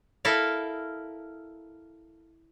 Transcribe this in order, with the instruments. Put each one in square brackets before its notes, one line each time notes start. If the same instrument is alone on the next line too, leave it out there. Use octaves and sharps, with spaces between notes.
[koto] E4 A4 A#4 F5